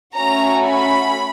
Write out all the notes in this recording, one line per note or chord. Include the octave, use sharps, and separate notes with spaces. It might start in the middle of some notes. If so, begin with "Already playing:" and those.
A3 C#4 F#4 A#5
B5